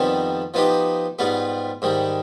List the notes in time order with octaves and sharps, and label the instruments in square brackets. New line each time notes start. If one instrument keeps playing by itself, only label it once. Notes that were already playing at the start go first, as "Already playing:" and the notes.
Already playing: [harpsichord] F2 D#3 G3 B3
F3 B3 D#4 G4
G#2 G3 B3 F4
G#2 D#3 G3